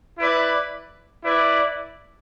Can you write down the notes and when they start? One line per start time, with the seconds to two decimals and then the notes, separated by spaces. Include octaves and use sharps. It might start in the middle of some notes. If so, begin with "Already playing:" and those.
0.19 E4 B4 D5
1.24 E4 B4 D5